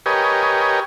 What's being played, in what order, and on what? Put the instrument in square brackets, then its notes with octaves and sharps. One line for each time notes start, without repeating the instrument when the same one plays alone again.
[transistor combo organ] G4 A#4 B4 C#5 D#5 G#5